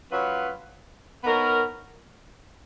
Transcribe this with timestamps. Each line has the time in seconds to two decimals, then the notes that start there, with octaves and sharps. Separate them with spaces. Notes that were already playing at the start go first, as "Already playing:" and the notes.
0.11 F#3 C#4 F4 B4
1.24 B3 D#4 A#4 C#5